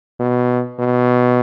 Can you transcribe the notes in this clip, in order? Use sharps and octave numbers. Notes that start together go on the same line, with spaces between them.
B2
B2